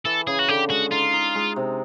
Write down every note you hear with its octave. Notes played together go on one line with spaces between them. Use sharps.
E3 A4
C#3 G#4
F#4
D3 G4
G#3 F#4
D#4 F4
D#4
G#3
C3